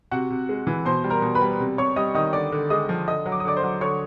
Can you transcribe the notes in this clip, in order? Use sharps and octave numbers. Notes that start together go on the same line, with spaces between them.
C3 F#4 F#5
C3
G#3
E3
B2 C5 C6
G3
A#4 A#5
B2
B4 B5
G3
C3
C3 C#5 C#6
G3 D#5 D#6
D#3 D#5 D#6
D3 D5 D6
D3
G#3 D#5 D#6
F3
D3 D#5 D#6
F#3
D6
D#6
D3 D5 D6
C5 C6
F#3
D3 C#5 C#6